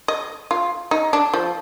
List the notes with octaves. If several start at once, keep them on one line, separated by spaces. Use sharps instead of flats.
D#5
F4
D#4
D4
F3